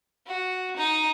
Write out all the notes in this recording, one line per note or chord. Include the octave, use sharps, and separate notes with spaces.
F#4
D#4